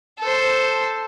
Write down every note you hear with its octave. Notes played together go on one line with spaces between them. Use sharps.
A4 C5